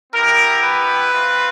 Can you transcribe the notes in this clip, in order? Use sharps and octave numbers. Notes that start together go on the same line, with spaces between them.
B3 E4 G4 A#4
B4
C4 F4